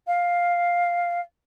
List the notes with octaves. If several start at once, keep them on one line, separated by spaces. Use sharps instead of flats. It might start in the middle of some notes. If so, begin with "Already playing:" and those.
F5